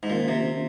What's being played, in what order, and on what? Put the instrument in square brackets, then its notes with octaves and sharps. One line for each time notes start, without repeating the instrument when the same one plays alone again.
[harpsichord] G#2
[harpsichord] A#2 [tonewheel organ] D#3 A#3 C#4 F4
[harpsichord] C3